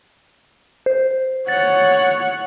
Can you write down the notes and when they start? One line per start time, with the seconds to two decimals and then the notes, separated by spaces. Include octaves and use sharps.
0.86 C5
1.48 C#5 F#5 A6